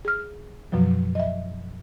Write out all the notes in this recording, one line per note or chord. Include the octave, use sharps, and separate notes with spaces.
G#4 F6
F#2 B2 F3 F#3
D#5 E5